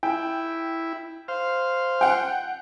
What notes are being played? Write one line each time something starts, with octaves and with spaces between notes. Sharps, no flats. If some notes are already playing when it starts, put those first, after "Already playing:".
E4 G5
C5 F5
F#5 G5